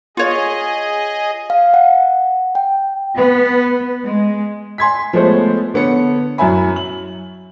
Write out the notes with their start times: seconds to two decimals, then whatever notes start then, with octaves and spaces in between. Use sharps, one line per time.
0.17 F4 G#4 C#5 D#5
1.50 F5
1.74 F#5
2.55 G5
3.16 B3
4.03 G#3
4.78 G#5 C6 G#6 B6
5.13 F3 G#3 A3 B3 C5 C#5
5.74 D3 B3 C#5 C#7
6.38 F#2 F#3 E4 E5 G#5 B5
6.76 F#7